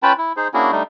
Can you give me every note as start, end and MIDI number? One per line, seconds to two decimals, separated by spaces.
0.03 0.13 61
0.03 0.13 65
0.03 0.13 71
0.03 0.13 79
0.03 0.13 81
0.03 0.13 83
0.18 0.33 64
0.36 0.48 63
0.36 0.48 68
0.36 0.48 72
0.54 0.71 58
0.54 0.71 61
0.54 0.71 62
0.54 0.71 64
0.54 0.71 66
0.54 0.71 68
0.72 0.83 55
0.72 0.83 57
0.72 0.83 62
0.72 0.83 63